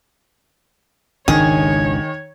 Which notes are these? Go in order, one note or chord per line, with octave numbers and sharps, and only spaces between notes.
G#1 C#2 D#3 D4 G#4 C#5